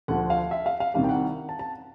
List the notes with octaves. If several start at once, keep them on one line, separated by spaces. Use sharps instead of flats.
D2 D3 F3 F#5
F5
E5
F5
F5
C2 C3 D#3 G3 F5
G5
F#5
A5
A5